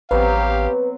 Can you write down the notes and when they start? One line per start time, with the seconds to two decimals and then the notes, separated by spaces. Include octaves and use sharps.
0.11 A1 F#3 B3 C4 G4 B4 F5